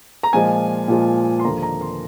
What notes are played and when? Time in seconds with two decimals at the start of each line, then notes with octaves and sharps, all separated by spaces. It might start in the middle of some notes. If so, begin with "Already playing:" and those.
0.23 A#5
0.33 A#2 F3 G#3 G#5
0.88 A#2 F3 G#3
1.39 C6
1.44 D#2 D3 F3 A#3 A#5
1.62 A#5
1.81 C6